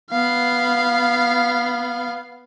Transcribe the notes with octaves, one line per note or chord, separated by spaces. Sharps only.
B3 F5